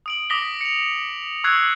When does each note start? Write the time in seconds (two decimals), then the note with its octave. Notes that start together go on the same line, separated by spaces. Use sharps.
0.06 D#6 D7 F#7
0.30 D6 D#6 A#6 B6 G7
0.61 C#7 F7
1.44 C#6 D#6 E6 F#6 G#6 C7